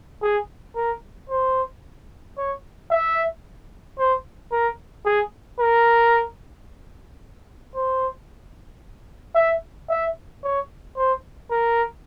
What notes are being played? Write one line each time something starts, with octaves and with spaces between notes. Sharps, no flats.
G#4
A#4
C5
C#5
E5
C5
A#4
G#4
A#4
C5
E5
E5
C#5
C5
A#4